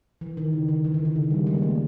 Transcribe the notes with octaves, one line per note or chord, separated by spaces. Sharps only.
E3
D#3
C#3
D3
E3
D#3
D3
C#3
G3
G#3
A#3
A3